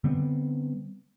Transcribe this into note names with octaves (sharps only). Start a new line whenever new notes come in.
D3 G3 B3 C4